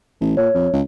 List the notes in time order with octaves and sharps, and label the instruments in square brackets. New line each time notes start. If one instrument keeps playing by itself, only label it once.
[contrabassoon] A1
[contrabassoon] A#2 [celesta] C#5
[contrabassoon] F2
C#2